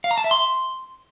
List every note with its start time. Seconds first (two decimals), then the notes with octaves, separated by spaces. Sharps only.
0.04 F5
0.11 A#5
0.18 A5
0.24 E5
0.31 C6